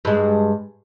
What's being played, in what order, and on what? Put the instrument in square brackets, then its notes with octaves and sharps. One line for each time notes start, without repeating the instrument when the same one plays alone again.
[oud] G2 G#3